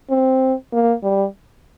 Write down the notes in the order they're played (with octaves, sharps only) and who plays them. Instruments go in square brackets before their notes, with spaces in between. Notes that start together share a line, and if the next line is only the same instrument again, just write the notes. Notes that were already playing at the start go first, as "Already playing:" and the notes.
[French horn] C4
A#3
G3